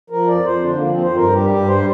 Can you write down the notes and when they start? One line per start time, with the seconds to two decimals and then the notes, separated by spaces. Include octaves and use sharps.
0.10 F3 A#4
0.28 F2 D5
0.45 F2 C5
0.63 D3 D4
0.75 F3 A#3
0.89 C4
0.98 F2 C5
1.15 G2 A#4
1.33 G3 G4
1.50 G2 G4
1.68 G3 C5